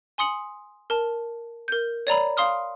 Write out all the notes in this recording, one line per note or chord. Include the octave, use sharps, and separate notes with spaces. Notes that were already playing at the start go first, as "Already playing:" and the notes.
G#5 C6 D#6 C#7 F#7
A#4 A5
A#4 G6
C#5 D5 A#5 B5
F5 C6 D#6 F6